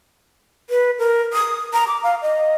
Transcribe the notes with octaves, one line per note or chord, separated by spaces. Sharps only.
B4
A#4
D#6
A#5
D6
F5
D#5